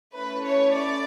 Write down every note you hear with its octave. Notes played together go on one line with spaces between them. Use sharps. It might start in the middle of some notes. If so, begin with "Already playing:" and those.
A3 C#4 E4 B4
C#5
D5